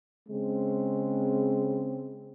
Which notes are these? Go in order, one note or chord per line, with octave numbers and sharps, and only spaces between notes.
C#3 G#3 C4